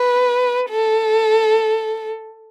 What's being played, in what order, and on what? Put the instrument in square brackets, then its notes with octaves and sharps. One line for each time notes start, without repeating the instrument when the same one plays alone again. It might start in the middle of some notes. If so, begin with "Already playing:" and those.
Already playing: [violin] B4
A4